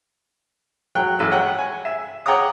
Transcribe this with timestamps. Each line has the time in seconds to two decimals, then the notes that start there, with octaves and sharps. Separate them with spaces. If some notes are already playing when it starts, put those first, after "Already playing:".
0.95 F#3 G5 F#6
1.19 A1 E6
1.31 C#5 F#5 G5
1.59 G#5
1.85 E5
2.26 C#5 F#5 G5 A#5 D6 D#6